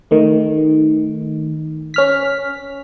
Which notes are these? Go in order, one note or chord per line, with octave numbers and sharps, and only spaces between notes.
D#3 A3
C#4 F6 B6